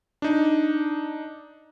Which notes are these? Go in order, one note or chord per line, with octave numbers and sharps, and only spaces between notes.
D4 D#4